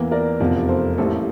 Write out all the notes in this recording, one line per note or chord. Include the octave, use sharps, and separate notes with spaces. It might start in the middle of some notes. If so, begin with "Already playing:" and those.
Already playing: E2 E3 A#3
A#4 D5
F1 E2 C3 F3
A4 C5
A1 A2 G3 A#3 A4 C5